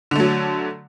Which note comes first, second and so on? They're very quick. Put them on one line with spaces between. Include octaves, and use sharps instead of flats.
D3 A3 F#3